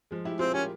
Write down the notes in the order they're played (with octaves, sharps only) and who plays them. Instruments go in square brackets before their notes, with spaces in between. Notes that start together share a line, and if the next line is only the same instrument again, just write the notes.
[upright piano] F3 G#3
E4 G4
[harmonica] C4 [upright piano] F4 G#4
[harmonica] C#4 [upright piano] G4 A#4